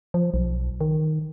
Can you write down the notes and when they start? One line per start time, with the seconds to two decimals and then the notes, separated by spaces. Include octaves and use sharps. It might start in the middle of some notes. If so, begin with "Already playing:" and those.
0.14 F3
0.34 B1
0.81 D#3